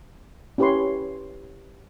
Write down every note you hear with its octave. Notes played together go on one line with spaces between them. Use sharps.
C#4 E4 G4 B4 C#5 C6